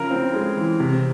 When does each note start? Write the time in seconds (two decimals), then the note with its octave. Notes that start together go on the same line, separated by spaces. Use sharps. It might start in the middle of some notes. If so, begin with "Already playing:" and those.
Already playing: C#3 F3 A#4
0.11 C4
0.34 G#3
0.57 E3
0.80 C3